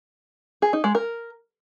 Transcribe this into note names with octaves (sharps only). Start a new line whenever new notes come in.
G#4
D#4
G#3
A#4